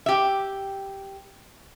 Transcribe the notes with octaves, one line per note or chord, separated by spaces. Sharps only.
G4 E5